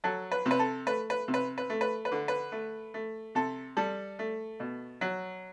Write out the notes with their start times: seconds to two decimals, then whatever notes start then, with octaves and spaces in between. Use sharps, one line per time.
0.04 F#3 A4
0.31 B4
0.46 C3
0.51 B4
0.59 A4
0.87 A3 B4
1.10 B4
1.28 C3
1.34 B4
1.58 B4
1.70 A3
1.81 B4
2.05 B4
2.12 D3
2.28 B4
2.52 A3
2.94 A3
3.35 C3 A4
3.77 G3 A4
4.19 A3
4.60 B2
5.01 F#3